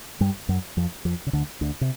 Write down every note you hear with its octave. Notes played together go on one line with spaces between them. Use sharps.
G2 G3
F#2 F#3
F2 F3
F2 F3
C#3
D2 D3
D2 D3
C3